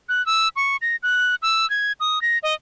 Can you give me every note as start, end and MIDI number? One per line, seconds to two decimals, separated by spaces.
0.09 0.24 90
0.26 0.48 88
0.56 0.77 85
0.82 0.96 94
1.03 1.35 90
1.42 1.68 88
1.70 1.92 92
2.00 2.21 87
2.22 2.38 94
2.43 2.54 75